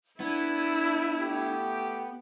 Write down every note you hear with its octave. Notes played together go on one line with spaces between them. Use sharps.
B3 D4 E4 G#6
A3 G4